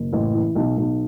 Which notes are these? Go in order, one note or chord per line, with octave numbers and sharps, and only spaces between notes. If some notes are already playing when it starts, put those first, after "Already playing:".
Already playing: F#1
A1
E3
B1
B1